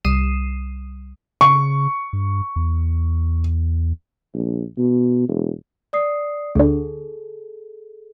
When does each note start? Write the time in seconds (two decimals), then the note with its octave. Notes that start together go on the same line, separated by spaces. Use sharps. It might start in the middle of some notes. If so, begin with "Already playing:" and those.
0.05 C2 G3 D#6 C7 D#7 E7
1.41 C#3 C#6
2.13 G2
2.56 E2
4.34 A#1
4.78 B2
5.29 E1
5.93 D5 D#6 C7
6.55 D2 D3 G#4 A4